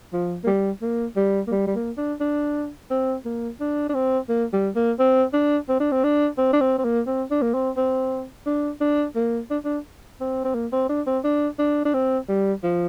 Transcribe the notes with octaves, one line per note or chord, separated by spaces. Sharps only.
F3
A#3
G3
A#3
G3
A#3
G3
G3
A#3
D4
D4
C4
A#3
D4
D4
C4
A#3
G3
A#3
C4
D4
C4
D4
C4
D4
C4
D4
C4
C4
A#3
C4
D4
A#3
C4
C4
D4
D4
A#3
D4
D4
C4
C4
A#3
C4
D4
C4
D4
D4
D4
C4
G3
F3